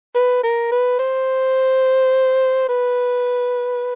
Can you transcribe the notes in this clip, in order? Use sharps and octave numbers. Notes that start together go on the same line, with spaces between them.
B4
A#4
B4
C5
B4